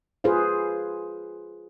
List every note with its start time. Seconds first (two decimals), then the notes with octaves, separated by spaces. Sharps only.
0.24 F4 G#4 B4 C5 F5